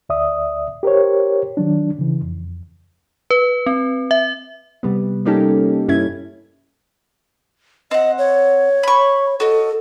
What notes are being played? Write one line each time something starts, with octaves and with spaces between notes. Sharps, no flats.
D2 D5 E5 D#6
G4 A#4 C5 C#5
D#3 F#3 D4
C#3 E3
F2
B4
C4
E5
C3 G3 B3
G3 A#3 C#4 D#4 G4 A4
G2 C#4 E4 G#6
C4 D#5 F#5
C#5
B5 C#6
F#4 A4 D#5